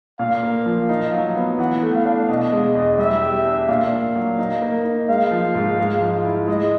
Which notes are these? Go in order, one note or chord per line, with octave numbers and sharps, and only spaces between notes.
A#2 F5
A#3
F3
D#4
F#3
B3
E3 F#5
A3
F5
D4
B2 D#5
G#3
E2
G3 E5
G4
D4
A#2 F5
A#2
F#3
D#4
A#3
D#4
G#3 F5
F3
G#2
G#3
F3
E4
G#3 D#5